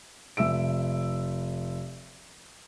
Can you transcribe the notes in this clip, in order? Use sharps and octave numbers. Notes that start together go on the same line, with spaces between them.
F1 E5 E6 D7